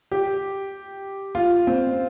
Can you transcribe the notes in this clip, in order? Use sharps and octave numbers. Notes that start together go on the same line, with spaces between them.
G4
F4
C4